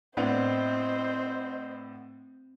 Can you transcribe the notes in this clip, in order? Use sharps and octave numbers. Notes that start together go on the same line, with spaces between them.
A2 B3 C4 D4 C5 D#5